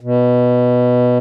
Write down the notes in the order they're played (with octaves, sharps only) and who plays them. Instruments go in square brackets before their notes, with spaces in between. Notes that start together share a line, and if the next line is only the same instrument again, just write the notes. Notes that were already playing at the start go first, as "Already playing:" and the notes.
[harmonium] B2